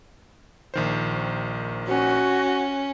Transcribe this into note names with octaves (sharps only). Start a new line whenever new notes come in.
A#1 D#3 C5
C#4 F#4